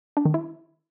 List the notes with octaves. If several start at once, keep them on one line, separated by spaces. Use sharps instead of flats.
D4
D#3
E4